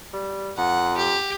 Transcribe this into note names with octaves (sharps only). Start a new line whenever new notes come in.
G3
F2 F#5
G4